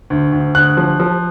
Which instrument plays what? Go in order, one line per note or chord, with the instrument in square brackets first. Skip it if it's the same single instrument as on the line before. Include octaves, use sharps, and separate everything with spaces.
[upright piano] D2
D2
D2 F#6
F3
F3